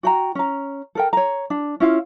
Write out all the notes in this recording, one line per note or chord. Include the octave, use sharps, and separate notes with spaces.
F#4 G5 A#5
C#4 A#5
A4 A#4 G5
C#5 A#5
D4
C#4 E4 F4 F5